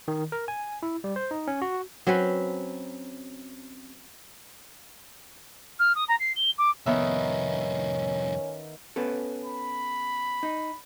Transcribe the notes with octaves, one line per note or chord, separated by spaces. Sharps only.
D#3
A#4
G#5
E4
G3
C5
D#4
C#4
F#4
F#3 C4 C#4 B4
F6
D#6
A#5
C7
G7
D6
C2 F2 D#3 B3 C#4 E5
B3 C#4 A4
B5
D#4